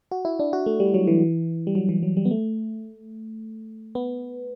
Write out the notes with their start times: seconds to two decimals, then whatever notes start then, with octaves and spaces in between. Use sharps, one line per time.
0.11 F#4
0.25 E4
0.39 D4
0.53 F#4
0.66 A3
0.80 G3
0.94 F#3
1.07 E3
1.67 G3
1.75 F#3
1.89 E3
2.03 F#3
2.17 G3
2.25 B3
2.31 A3
3.95 B3